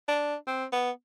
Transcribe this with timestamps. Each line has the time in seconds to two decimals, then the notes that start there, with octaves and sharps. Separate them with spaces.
0.08 D4
0.47 C4
0.73 B3